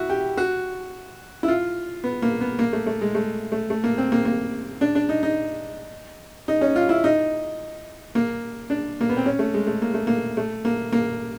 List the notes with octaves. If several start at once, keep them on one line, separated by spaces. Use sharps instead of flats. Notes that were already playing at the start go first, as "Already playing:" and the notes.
Already playing: E4 F#4
G4
F#4
E4
F4
B3
A#3
B3
A#3
A3
A3
G#3
A3
A3
A3
A#3
C4
A#3
A#3
D4
D4
D#4
D#4
D#4
C#4
F4
E4
D#4
A#3
D4
A#3
B3
C4
C#4
A3
G#3
A3
A#3
A3
A#3
A3
A#3
A#3